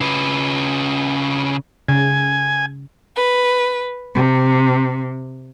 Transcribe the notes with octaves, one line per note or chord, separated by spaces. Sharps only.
C#3 B4
C#3 G#5
B4
C3